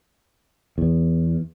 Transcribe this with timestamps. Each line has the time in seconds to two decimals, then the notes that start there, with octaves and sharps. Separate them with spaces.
0.78 E2